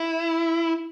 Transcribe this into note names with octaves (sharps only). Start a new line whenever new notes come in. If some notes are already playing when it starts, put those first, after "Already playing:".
Already playing: E4